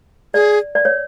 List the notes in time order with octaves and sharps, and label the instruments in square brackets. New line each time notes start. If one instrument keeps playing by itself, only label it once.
[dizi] G#4 [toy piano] D5
[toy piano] D5
C#5